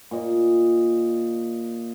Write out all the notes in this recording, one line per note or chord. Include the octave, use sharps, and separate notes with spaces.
A#2 D#5